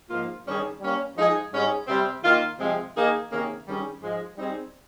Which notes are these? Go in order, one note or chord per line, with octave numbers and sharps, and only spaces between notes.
G#2 F3 A#3 F4
G2 D#3 G3 C#4 G#4
G3 A#3 C#4
F3 G#3 D#4 G#4
G#2 G3 C#4 G#4
C3 G3 C4
D#3 A#3 F4
C3 F3 G#3 C4
D#3 A#3 D#4 G#4
C3 D#3 A#3 C#4 G#4
G2 D#3 G3 C#4 G#4
G#2 F3 G#3
G3 C4 D#4 G#4